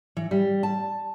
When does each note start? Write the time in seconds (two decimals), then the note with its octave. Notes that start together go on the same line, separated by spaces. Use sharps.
0.17 E3
0.31 G3
0.63 A5